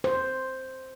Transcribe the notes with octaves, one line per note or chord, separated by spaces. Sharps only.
C5